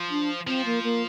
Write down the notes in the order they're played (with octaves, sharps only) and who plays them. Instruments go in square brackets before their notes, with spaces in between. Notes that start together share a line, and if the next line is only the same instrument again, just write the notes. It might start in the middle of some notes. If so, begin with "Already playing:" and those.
Already playing: [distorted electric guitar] F3
[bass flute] D4
[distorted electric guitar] F3 [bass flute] C4
[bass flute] A#3
A#3